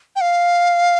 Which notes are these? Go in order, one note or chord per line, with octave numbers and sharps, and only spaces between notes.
G5
F5